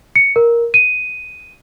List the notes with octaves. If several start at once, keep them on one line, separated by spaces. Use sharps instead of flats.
C#7
A#4
D#7